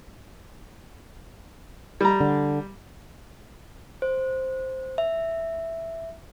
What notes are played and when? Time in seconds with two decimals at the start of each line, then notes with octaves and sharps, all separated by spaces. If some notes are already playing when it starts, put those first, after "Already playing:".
2.01 G3 A#5
2.20 D3
4.02 C5
4.98 E5